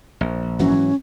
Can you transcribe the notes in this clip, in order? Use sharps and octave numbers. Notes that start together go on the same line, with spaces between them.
A#1
G#2 E3 F#3 C#4